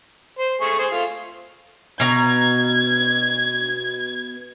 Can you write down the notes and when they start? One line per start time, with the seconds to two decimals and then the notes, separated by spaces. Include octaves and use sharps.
0.39 C5
0.61 A3 G#4 C#6
0.79 G#4 C5
0.92 A3 F4
2.00 B2 A#5 G#6